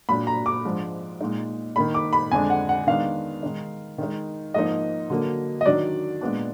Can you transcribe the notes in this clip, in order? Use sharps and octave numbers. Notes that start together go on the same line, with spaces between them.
A#2 F#3 D4 B5
A#5
D6
G#2 F3 G#3 D4
A#2 G#3 D#4
D#3 A#3 D#4 B5
D6
B5
F2 D3 G#3 D4 G#5
F#5
F#5
D#3 G#3 B3 D4 F5
D#3 G#3 D#4
D#3 G#3 D#4
G#2 F3 A#3 D#4 D#5
D3 F#3 A#3
D#5
D#3 F#3 D4 D5
A#2 G#3 B3 D4